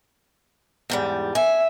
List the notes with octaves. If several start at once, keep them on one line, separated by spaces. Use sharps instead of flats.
E2 G#2 G3
E5 G#5